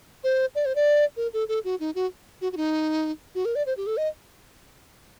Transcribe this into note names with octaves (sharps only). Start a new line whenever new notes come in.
C5
D5
C5
D5
A#4
A4
A4
F#4
D#4
F#4
F#4
F#4
D#4
F#4
A#4
D5
C5
G4
A4
D#5